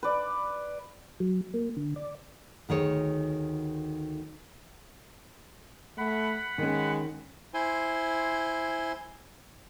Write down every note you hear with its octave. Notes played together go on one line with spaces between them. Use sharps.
B4 D5
F#3
A#3
D3
D5
D2 D#3 G#4 C#5
A3 F#5 B5
D#3 G#3 C#4
E4 C5 G#5 C6